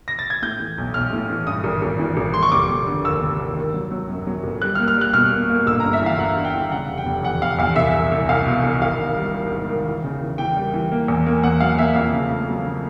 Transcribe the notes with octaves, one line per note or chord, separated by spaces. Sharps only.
A#6
A6
G#6
A2 G6
E3
B1
B1 F6
A2
E3
G2 D#6
G#1
G#1
E3
G#1
G#1 C6
C#6
F1 D6
F1
D3
D#2 E6
F1
D#2
D#3
F#3
F#3
F#2
F#3
G1
G3 F#6
F6
A#3
F6
G3 F#6
B2 F6
A#3
A#3
G1 E6
A#5
G2
E5
E3 F5
G1 F#5
G1
G5
E3
C#3 F#5
F1
G5
F1
E2 F#5
F1 F5
E2 F5
C2 E5
C2
C2
C2 F5
B2
C2
G#1 F5
D#3
G3
D#3
G#2
D#3
E3
C#3
E3
E3 G5
G3
E3
A#3
E2
A#3
E2 F#5
F#3 F5
A#3 E5
F2 F5
C#3
A3
F#3
C#3